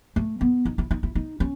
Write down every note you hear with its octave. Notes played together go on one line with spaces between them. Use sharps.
A3
B3
D#4
E4
D#4
E4
D#4
C#4